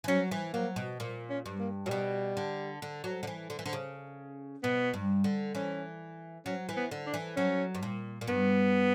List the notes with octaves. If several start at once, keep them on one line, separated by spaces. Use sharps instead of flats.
E3
F#3 C#4
E3
F#3 A#3
B2
A#2
C#4
G2
A#3
A#2 F#3
B2 G3
D3
D3
F#3
D3
E3
D3
E3
D3
C#3
B2 B3
G2
D3
E3 C#4
F#3 C#4
E3
B3
D3
D4
E3
F#3 C#4
G2
A#2
A#2
G2 B3